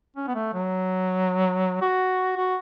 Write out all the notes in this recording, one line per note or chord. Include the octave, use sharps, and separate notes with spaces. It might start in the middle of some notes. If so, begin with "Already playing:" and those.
C#4
B3
A3
F#3
F#4
F#4